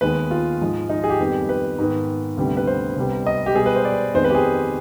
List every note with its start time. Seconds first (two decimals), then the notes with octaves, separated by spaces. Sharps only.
0.01 D#2 D#3 G#3 B3 B4
0.31 F4
0.61 G#2 F3 G#3
0.89 D#4
1.04 G#4
1.10 G4
1.19 F2 D#3 G3 B3
1.49 B4
1.79 G#2 D#3 B3
2.37 D2 C3 G3 B3
2.57 B4
2.67 C5
2.97 C2 C3 G3 B3
3.27 D#5
3.46 G4
3.55 B2 G3 B3 G#4
3.66 B4
3.76 C5
3.85 D5
4.14 F2 D#3 G#3 B3 C5
4.24 B4
4.30 G4
4.35 G#4